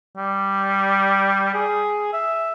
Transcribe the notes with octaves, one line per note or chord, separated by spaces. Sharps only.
G3
G#4
E5